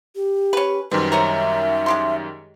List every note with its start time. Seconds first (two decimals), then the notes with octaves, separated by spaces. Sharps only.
0.16 G4
0.53 C#4 B4
0.91 F#2 D#3 G3 C4 B4
1.12 C3 C#4 A#4 E5
1.86 G#3 G4 C6